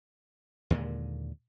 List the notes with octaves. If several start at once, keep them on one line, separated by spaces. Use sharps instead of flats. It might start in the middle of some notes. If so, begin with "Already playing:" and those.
D#2 A#2 D3 G#3